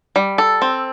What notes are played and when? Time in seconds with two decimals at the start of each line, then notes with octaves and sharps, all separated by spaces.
0.16 G3
0.38 A4
0.62 C4